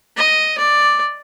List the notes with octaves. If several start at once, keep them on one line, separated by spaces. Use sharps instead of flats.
D#5
D5